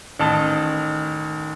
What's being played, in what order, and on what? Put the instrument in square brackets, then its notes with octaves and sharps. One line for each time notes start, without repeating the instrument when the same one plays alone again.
[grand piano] A1 A5 [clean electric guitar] D#3